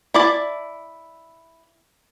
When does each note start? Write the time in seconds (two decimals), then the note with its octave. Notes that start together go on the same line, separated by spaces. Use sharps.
0.14 E4 D5 A5